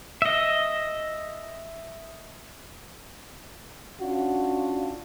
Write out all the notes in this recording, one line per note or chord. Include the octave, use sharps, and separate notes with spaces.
D#5 E5
C#4 D4 F4 F#4